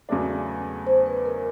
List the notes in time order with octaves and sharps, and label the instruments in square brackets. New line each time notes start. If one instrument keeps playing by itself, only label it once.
[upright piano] E2 C#3 F#3 A3 D4
[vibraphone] C5
B4
A#4